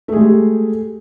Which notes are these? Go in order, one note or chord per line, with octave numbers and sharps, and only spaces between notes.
G#3 A3 G4 G#4